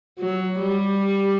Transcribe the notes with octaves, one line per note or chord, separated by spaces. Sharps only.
F#3
G3